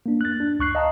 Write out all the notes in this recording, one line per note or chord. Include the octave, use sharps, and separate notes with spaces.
A#3 D4
F#6 A6
D4
C#2 C#6 F#6 C7
D#5 F5 A5 A#5